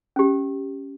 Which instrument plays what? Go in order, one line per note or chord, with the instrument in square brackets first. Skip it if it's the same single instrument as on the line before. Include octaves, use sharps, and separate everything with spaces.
[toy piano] C#4 G4